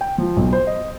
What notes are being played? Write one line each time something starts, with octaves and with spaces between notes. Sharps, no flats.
G5
F3
B1
C5
D#5